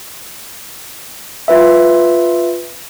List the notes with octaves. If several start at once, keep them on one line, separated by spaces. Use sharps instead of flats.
F4 B4 E5